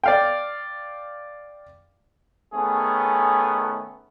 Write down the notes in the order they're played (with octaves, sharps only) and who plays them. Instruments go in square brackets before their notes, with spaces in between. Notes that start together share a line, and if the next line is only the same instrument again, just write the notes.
[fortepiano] D5 F5 G5
[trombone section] D#3 A3 B3 C#4 G#4